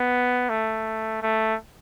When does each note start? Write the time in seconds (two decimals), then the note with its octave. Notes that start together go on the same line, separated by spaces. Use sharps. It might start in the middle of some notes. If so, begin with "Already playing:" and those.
Already playing: B3
0.49 A3
1.22 A3